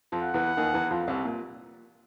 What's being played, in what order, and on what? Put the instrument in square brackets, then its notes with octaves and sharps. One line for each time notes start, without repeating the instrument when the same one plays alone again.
[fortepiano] F2 F3
[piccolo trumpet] F#5
[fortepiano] E2 E3
D#2 D#3
E2 E3
F2 F3
C2 C3
A#2